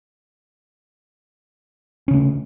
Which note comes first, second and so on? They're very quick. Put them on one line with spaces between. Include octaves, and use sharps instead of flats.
C#4 C#3 A3